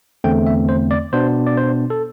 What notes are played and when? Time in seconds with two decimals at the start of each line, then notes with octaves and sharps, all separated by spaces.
0.24 E2 D3 A3 C4 G5
0.47 E5
0.69 C5
0.91 D5
1.13 B2 B3 D4 C5
1.46 D5
1.57 C5
1.90 A4